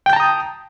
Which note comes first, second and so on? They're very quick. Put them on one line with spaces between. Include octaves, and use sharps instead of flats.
G5 G6 A5 A#5 D#6